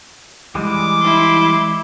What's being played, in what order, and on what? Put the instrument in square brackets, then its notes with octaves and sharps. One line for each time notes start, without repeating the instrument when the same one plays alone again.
[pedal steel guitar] E3 G3 G#3 [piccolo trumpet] D6
[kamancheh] E4 C6